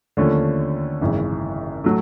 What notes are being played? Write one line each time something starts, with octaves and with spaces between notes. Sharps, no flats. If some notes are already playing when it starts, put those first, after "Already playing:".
D#2 D3 F3 A3 C#4
G#1 F#2 C#3 E3
A2 F#3 A3